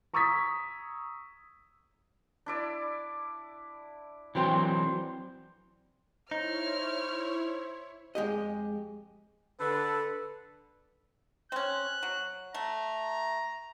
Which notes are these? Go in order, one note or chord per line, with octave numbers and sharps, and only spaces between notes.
A#5 C#6 D#6 E6 G#6 B6
D4 E4 D5
E3 F#3 C4 C5 G5 C6
D#4 E4 C5 C#5 F6
F2 G#3 G4 D#5
D3 A4 B4
C4 C#4 F#6
F#3
A3 A#5